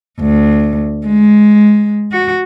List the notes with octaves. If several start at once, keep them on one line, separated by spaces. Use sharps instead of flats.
D2
G#3
F#4